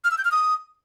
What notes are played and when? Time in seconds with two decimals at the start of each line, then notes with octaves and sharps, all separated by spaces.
0.04 F6
0.11 E6
0.18 G6
0.25 F6
0.32 D#6